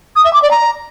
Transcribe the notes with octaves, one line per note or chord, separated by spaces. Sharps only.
D#6
E5
D6
D5
A#5